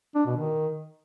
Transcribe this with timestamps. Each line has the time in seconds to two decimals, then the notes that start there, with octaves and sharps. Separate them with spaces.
0.15 D4
0.26 B2
0.37 D#3